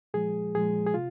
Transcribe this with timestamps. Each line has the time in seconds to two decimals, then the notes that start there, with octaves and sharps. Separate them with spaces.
0.14 A#2 F3 G#3 G#4
0.55 A#2 F3 G#3 G#4
0.86 G#4
0.94 C3 F4